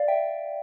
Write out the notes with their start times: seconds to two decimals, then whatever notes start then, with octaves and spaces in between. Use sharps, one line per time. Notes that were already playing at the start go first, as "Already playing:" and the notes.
Already playing: D5 F5
0.08 E5 G5